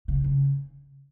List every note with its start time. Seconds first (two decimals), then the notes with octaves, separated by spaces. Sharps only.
0.08 C#3
0.24 C#3